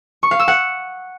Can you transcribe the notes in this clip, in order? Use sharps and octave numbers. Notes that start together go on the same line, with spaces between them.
C#6
F5
E6
F#5